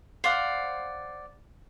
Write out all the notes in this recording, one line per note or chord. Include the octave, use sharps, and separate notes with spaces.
C5 D5 F5 F#5